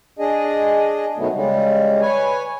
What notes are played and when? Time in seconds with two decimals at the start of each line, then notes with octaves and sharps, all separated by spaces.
0.19 D4 G#4 D#5
1.17 B2 D#3 F#3 A3 B3
1.33 C#3 G3 G#3
2.01 B4 C#5 G#5